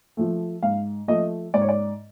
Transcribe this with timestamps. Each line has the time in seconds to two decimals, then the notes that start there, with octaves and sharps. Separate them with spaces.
0.17 F3 A3
0.63 G#2 F5
1.08 F3 A3 D#5
1.54 G#2 D5
1.61 C#5
1.69 D5